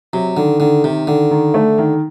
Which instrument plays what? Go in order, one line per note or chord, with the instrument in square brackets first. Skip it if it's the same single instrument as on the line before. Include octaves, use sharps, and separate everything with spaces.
[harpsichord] C3 [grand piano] F#3
[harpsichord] D3 [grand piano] D#3
[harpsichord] D3 [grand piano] D#3
[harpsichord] C3 [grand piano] D#3
[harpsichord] D3 [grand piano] D#3
[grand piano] D#3
A3
D#3